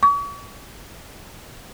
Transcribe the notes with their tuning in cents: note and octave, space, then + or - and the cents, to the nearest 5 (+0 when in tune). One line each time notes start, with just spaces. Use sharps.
C#6 +40